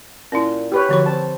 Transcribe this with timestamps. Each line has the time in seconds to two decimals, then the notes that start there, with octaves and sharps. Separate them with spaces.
0.32 A#2 C#4 E4
0.72 G4 B4 C#5
0.89 D3 F3 F#3 C#6
1.06 C4 A5